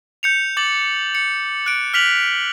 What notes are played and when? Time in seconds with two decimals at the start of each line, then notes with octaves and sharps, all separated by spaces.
0.23 G6 C#7 F7
0.57 D6 A6 F#7
1.15 C#7
1.66 F#6 D7
1.94 F6 B6 F7 F#7